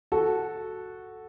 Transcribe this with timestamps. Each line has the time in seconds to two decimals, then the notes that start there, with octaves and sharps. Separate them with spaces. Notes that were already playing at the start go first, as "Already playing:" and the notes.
0.12 F#4 A4